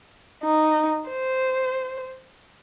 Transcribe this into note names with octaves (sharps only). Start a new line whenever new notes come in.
D#4
C5